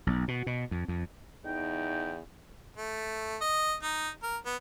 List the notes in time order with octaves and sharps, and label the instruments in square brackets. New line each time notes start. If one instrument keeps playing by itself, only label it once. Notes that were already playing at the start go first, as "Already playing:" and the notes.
[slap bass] B1
B2
B2
F2
F2
[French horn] E2 [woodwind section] D#4 G5
[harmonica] A3
D#5
D#4
A#4
B3